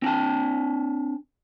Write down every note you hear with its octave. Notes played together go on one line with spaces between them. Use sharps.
C4 D4 G5 A5